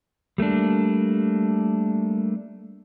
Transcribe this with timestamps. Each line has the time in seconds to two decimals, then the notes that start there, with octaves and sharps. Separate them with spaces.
0.38 G3 A3 A#3 D4